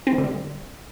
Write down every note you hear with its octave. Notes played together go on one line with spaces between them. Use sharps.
C4
D#3
D3
G3